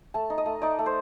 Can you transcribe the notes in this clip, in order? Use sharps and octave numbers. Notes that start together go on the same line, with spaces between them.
A3 A5
D#4
D#5
A3
D#4 D5
A3
C5